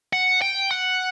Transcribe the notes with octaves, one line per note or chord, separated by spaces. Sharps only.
F#5
G5
F#5